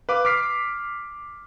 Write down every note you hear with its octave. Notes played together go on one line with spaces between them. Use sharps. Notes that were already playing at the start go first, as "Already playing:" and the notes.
B4 F5 D6
D6 F6 B6 C7 D7